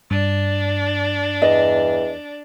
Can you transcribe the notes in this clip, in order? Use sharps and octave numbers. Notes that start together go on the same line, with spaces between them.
G2 D4
E2 D#5